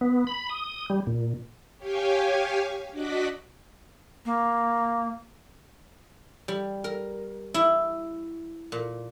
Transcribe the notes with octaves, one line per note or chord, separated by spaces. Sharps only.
B3
B5
D#6
G3
A#2
G4 C#5 F5 G5 G#5
D4 F#4 D5 D#5 F#6 B6
A#3
G3
A#4
E4
A#2